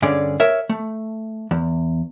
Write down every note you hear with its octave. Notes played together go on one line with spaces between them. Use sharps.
G2 D3 C#4 G#4 D5
A#4 C#5 E5
A3
E2